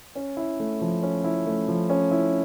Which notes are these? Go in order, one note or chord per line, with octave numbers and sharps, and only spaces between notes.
C#4
E4
A3
F3
C#4
E4
A3
F3
C#4
E4